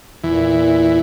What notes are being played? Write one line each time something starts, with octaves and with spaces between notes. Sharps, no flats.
E2 A#2 E3